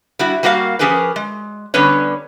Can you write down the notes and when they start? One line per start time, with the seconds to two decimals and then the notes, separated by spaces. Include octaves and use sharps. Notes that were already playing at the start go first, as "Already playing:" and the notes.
0.19 G3 E4 F#4
0.43 G3 A#3 F#4 A#4 F5
0.79 F3 C#4 G4 G#4 A#4 B4
1.16 G#3
1.74 D3 G3 B3 C#4 B4 C#5